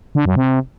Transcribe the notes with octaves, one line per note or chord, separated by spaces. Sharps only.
D3
F#2
C3